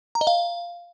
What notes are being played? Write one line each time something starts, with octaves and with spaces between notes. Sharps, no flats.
A#5
D#5
F5